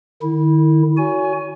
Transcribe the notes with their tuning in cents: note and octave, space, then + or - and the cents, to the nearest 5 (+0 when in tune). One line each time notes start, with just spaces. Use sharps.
D#3 -35 E4 -25
F#4 +10 C#5 +40 G#5 +0